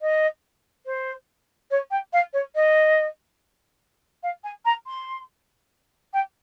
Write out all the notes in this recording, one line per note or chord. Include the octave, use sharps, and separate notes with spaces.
D#5
C5
C#5
G5
F5
C#5
D#5
F5
G#5
A#5
C6
G5